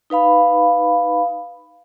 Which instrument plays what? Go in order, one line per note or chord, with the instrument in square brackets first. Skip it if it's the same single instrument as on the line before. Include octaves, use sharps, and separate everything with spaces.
[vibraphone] D#4 B4 F5 B5